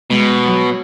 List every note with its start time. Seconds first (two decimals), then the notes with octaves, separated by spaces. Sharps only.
0.10 B2 G#3
0.43 F#3